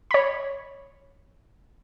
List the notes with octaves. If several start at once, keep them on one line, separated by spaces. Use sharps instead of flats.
C#5 B5